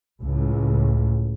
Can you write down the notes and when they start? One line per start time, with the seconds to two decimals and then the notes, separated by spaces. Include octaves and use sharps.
0.21 C#2 A2